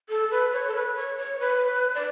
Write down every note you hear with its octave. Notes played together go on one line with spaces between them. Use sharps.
A4
B4
C#5
A4
B4
C#5
C#5
B4
D5